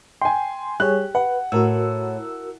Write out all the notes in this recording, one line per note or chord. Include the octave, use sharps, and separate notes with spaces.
G5 G#5 C6
G3 G4 G#4 C#5 F#6
B4 F#5
A2 F#4 A#4 E6